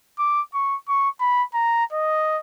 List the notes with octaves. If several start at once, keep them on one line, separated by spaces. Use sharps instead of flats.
D6
C#6
C#6
B5
A#5
D#5